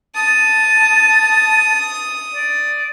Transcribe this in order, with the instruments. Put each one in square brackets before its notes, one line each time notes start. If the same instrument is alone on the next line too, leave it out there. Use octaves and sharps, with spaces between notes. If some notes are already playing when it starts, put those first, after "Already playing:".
[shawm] A5 [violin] D#6
[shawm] D5